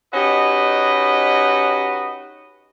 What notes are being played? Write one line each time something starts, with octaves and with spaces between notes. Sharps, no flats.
C#4 D#4 F#4 G4 B4 D#5